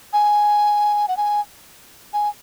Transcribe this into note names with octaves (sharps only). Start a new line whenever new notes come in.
G#5
F#5
G#5
G#5